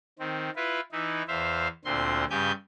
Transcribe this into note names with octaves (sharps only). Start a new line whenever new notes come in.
D#3 C4
E4 F4 B4
E3 D#4 E4
E2 C5 E5 F5
D2 A#2 D3 C4 C6
G2 C#3 G4 G#5 G6